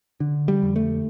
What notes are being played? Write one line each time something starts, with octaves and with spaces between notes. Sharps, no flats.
D3
G3
F2
A3